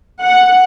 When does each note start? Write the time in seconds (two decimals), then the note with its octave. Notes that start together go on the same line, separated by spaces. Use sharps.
0.23 F#5